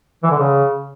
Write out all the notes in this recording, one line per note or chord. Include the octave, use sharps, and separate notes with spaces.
E3
D3
C#3